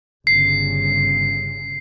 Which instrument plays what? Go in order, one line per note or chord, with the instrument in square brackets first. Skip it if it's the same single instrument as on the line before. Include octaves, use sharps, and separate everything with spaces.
[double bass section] G1 C#3 [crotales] C7